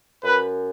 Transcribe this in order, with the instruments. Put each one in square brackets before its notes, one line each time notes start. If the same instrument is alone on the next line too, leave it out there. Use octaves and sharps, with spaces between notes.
[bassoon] F#2 [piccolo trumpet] B4